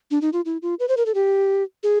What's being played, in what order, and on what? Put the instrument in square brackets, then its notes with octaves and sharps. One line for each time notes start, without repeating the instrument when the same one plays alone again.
[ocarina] D4
D#4
F4
E4
F4
B4
C5
A#4
A4
G4
G#4